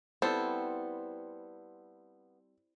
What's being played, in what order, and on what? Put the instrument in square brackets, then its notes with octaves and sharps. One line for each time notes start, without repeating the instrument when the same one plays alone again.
[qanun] G3 C4 E4 [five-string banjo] B3 [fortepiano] A4 C5